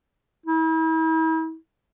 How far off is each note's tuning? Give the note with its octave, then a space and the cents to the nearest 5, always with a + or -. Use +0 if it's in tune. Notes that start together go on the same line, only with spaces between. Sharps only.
E4 -40